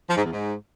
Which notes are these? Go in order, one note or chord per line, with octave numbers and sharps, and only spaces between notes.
F3
G#2
E2
G#2